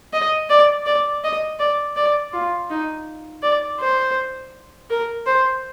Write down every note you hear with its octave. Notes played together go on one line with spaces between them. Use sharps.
D#5
D5
D5
D#5
D5
D5
F4
D#4
D5
C5
A#4
C5